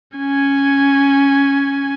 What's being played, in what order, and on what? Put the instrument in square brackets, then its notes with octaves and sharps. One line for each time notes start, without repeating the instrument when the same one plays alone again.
[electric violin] C#4 G#5